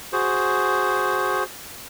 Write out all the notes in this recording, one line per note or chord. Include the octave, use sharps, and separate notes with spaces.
F#4 G#4 C5